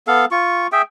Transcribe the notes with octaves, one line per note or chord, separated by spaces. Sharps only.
B3 A4 F5
F4 C#6
G#4 E5 G5